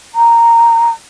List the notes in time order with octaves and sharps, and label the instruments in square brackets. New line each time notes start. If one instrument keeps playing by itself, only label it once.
[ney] A#5